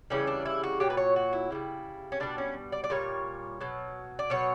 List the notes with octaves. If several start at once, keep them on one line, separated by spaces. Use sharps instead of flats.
C#3 E3 G3 C#4
D4
E4
F#4
A#2 F#3 G4
B4
C#5
F#4
E4
C#3 E3 G3
C#4
B2 G3 D4
C#4
D5
D5
A#2 G3 C#5
B2 F#3
D5
B2 F#3 C#5